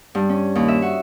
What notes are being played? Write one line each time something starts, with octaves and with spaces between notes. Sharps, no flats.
G2
C#4
D#2
E5
F#4